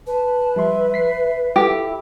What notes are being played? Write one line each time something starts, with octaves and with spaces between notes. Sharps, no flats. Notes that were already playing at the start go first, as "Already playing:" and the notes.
B4 A5
F3 G3 E5 C6
E5 B6 C7
E4 F4 G4 A4